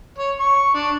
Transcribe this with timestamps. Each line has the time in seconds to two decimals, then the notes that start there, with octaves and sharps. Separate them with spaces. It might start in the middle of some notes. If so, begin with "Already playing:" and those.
0.18 C#5
0.40 C#6
0.74 D4